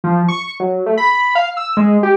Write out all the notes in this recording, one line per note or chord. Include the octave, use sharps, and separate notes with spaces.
F3
C#6
F#3
A3
B5
F5
E6
G#3
G4